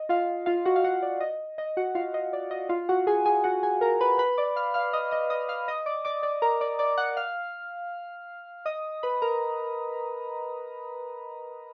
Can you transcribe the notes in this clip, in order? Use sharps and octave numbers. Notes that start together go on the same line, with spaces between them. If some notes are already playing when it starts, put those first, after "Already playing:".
Already playing: D#5
F4 F5
F4 F5
F#4 F#5
F5
F#4 F#5
D5
D#5
D#5
F#4 F#5
F4 F5
D#5
D5
D#5
F4 F5
F#4 F#5
G#4 G#5
G#4 G#5
F#4 F#5
G#4 G#5
A#4 A#5
B4 B5
B4 B5
D5 D6
F5 F6
F5 F6
D#5 D#6
D#5 D#6
D#5 D#6
F5 F6
D#5 D#6
D5 D6
D5 D6
D5 D6
A#4 A#5
D5 D6
D5 D6
F#5 F#6
F5 F6
D#5 D#6
B4 B5
A#4 A#5